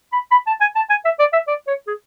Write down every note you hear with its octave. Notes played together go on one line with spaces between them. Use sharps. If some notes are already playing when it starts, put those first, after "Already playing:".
B5
B5
A5
G#5
A5
G#5
E5
D5
E5
D5
C#5
G#4